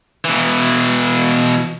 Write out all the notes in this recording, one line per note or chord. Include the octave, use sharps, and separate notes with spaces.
B2 E3